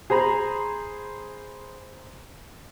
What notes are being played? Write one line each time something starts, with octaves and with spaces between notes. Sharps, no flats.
G#4 C5 A#5 B5